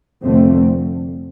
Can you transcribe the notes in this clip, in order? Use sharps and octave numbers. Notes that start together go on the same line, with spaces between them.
F1 F2 D3 A3 C4